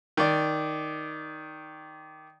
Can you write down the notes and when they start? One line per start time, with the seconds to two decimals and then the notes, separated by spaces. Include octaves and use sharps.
0.17 D#3 D5